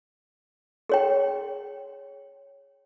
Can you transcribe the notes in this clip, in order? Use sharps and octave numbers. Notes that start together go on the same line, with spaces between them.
G#4 C#5 G5